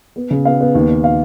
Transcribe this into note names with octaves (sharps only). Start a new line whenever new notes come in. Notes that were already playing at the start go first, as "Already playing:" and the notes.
B3
C#3
B3 F5
B3
D#2
B3
F5